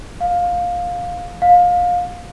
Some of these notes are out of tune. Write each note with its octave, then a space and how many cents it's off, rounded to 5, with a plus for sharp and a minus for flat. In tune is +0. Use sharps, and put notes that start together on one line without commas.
F5 +15
F5 +25